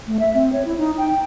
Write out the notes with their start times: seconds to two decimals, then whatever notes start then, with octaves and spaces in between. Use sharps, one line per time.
0.07 A3
0.19 E5
0.34 C4
0.53 C#5
0.65 E4
0.78 D#4
0.98 G5